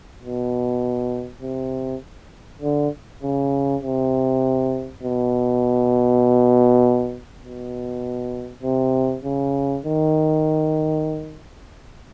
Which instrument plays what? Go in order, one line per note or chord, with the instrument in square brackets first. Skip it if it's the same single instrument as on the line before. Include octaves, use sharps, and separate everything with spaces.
[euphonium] B2
C3
D3
C#3
C3
B2
B2
C3
C#3
D#3